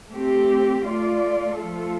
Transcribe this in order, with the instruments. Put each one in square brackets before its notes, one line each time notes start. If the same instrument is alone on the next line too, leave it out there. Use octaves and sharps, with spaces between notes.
[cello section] A3 C4 G4
A3 F4 D5
F3 A3 F4 A4